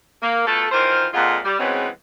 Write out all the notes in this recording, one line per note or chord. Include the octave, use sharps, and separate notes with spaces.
A#3
B2 A3 F4 A4
D#3 E3 F4 A#4 C5
F2 A#2 G#3 F4 F#5
G3
C#3 E3 F#3 G#3 B3 C4